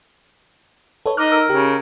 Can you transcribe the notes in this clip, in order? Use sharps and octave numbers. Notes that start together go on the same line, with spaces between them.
A4 B4 C#5
D#4 D6 F6 F#6
A#4 E6
C#3 G4